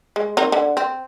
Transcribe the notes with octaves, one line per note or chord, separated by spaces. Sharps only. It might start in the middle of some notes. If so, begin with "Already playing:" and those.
G#3
C4 D#4 A#4
D3
C4